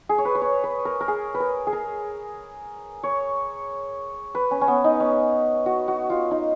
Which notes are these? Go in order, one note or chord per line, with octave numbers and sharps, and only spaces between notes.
G#4
C#5
B4
B4
C#5
B4
A#4
A#4
G#4
B4
A#4
G#4
A#4
C#5
B4
C#4
C#4
B3
D#4
C#4
F#4
F#4
F4
D#4